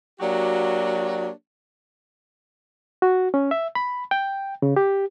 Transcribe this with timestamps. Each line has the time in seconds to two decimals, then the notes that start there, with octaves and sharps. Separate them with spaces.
0.20 F#3 A#3 D4 F#4 G4 C#5
3.02 F#4
3.34 C#4
3.51 E5
3.75 B5
4.11 G5
4.62 C#3
4.76 G4